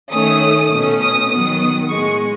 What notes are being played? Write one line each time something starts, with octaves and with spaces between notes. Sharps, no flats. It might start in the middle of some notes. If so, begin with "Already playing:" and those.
D#3 A3 C#4 D#6
B2 A3 C#4
D#6
D#3 F#3 B3 D#6
A2 G#3 B3 C#6